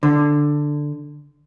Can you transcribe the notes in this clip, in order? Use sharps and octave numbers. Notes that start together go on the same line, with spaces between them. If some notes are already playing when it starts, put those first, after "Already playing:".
D3